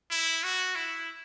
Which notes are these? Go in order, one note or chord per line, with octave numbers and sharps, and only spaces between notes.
E4
F#4
E4